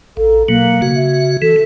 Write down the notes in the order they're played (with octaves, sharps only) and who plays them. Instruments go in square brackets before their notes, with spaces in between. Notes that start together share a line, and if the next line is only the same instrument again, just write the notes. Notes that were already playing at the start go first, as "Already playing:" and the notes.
[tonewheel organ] A#1 [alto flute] A4
[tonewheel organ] B2 F#3 [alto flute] A#3
[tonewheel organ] C#3 F#4
[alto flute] E5
[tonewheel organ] E3 [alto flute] A4